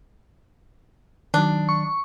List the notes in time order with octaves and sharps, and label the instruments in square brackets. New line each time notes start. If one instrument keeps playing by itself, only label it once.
[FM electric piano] D#3 F#3 [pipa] D4
[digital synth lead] C#6